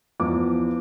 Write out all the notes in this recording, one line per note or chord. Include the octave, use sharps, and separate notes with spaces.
E2 F3 D6